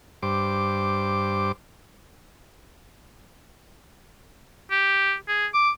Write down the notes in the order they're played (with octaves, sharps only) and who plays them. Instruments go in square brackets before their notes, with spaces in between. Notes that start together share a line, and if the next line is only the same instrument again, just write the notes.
[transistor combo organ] G2 C5 D6
[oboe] G4
G#4
D6